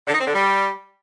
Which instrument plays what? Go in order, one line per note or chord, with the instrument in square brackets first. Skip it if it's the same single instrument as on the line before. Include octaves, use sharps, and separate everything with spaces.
[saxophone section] D3
D#4
C4
D3
G3